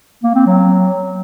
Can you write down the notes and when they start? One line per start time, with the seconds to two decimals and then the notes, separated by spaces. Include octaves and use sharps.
0.23 A#3
0.35 C4
0.46 F#3